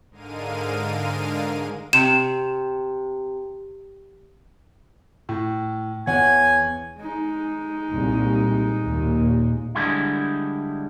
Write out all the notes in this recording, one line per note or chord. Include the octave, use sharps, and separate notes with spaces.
G#2 D3 G#3 A#4 F5 D#7
C3 E7
A2
E2 C#5 F#5 G#5
G#3 D#4
C2 A#2
D#2 A#2
D3 G3 G#3 E4